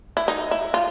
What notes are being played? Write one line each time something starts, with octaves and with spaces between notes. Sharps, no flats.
E4
D#4
E4
F4